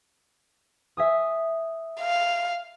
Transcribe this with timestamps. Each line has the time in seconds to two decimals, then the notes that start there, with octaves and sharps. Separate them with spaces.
0.97 E5 G#5 D#6
2.01 F5